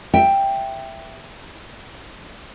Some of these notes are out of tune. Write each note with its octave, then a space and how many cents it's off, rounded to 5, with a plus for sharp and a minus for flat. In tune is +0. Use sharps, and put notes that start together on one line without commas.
E5 +5 G5 +5